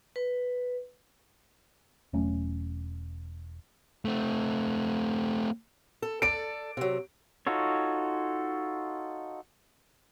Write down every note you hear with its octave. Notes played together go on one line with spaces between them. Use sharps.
B4
E1 F#3 A3 C#4
A3 C4
A4
A4 D5 D7
C3 F#3
D#4 F4 F#4 A4 C#5